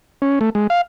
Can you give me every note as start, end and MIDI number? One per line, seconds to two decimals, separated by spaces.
0.22 0.39 61
0.41 0.50 57
0.55 0.67 56
0.70 0.81 77